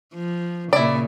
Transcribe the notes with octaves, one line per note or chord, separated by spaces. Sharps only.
F3
A#2 C#3 E4 D5